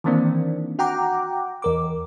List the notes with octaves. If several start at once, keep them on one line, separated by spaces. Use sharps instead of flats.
D#3 E3 A#3 C4 D4
F#4 F#5 G5 A#5 D6
E2 A#4 D6